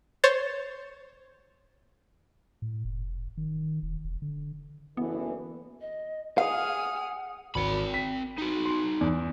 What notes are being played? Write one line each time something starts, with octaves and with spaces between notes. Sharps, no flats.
C5 C#5 A6
A2
F1
D#3
E1
E1
D3
F#1 D3 E3 B3
D#5
G#4 F5 F#5 D#6 F6
G#1 C4 B5
B6
D#4 F#4
C6
E2